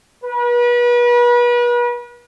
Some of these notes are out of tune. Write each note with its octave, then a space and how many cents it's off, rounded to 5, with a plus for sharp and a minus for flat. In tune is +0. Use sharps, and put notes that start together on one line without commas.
B4 -35